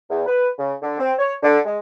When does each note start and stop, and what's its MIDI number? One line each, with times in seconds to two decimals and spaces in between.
0.10 0.26 40
0.27 0.48 71
0.59 0.74 49
0.82 0.96 50
0.99 1.13 60
1.19 1.34 73
1.42 1.59 50
1.65 1.78 56